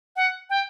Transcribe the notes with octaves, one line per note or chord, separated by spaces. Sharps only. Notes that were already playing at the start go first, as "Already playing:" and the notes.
F#5
G5